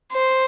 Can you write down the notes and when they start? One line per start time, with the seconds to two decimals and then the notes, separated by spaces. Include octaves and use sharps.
0.13 C5